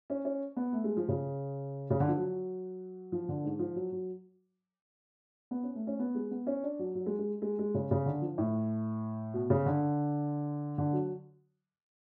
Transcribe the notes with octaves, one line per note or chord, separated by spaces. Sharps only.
C#4
C#4
B3
A3
G#3
F3
C#3
C#3
D3
F3
F#3
F3
D3
G#2
F3
F#3
F#3
B3
C#4
A3
C#4
B3
G#3
B3
C#4
D4
F#3
F#3
G#3
G#3
G#3
G#3
C#3
C#3
D3
F3
A2
B2
C#3
D3
D3
F#3